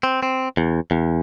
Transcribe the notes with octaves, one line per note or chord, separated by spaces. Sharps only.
C4
C4
E2
E2